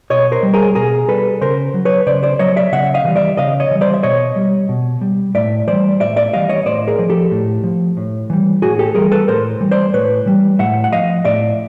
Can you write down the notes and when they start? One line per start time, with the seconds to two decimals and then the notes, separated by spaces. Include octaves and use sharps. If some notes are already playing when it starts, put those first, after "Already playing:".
0.10 B2 C#5 D#5
0.32 A#4 C5
0.43 G3
0.54 G#4 A#4
0.75 B2 G#4 A#4
1.09 G3 A4 B4
1.41 C#3 A#4 C5
1.74 F#3
1.85 B4 C#5
2.07 C#3 C5 D5
2.23 C5 D5
2.39 F#3 C#5 D#5
2.56 D5 E5
2.72 C#3 E5 F#5
2.94 D#5 F5
3.05 E3 G3
3.16 D5 E5
3.37 C#3 D#5 F5
3.60 C#5 D#5
3.71 E3 G3
3.81 C5 D5
3.94 E5
4.03 B2 C#5 D#5
4.36 G3
4.69 B2
5.01 G3
5.35 A2 D5 E5
5.67 E3 G3 C5 D5
6.00 A2 D5 E5
6.16 D5 E5
6.33 E3 G3 D#5 F5
6.49 C#5 D#5
6.66 A2 C5 D5
6.87 G#4 A#4
6.99 F3
7.10 G4 A4
7.32 A2
7.64 F3
7.97 A2
8.30 E3 G3
8.62 A2 F#4 G#4
8.79 G4 A4
8.95 E3 G3 G#4 A#4
9.12 A4 B4
9.28 A2 A#4 C5
9.61 E3 G3
9.71 C5 D5
9.94 A2 B4 C#5
10.26 E3 G3
10.59 A2 E5 F#5
10.84 F#5
10.92 F3 D#5 F5
11.25 A2 D5 E5